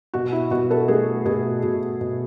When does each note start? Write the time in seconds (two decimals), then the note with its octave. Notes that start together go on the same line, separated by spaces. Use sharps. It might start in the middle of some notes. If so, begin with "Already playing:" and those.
0.14 B2 F#4
0.32 E4
0.51 B2 F#4
0.71 A4
0.88 A3 G#4
1.25 B2 G#4
1.63 B2 F#4
2.01 B2